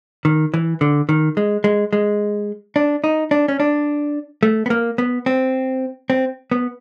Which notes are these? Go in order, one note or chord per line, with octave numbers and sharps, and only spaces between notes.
D#3
E3
D3
D#3
G#3
G#3
G#3
D4
D#4
D4
C#4
D4
A3
B3
A#3
B3
C4
C4
B3